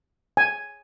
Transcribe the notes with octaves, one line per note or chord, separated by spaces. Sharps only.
G#5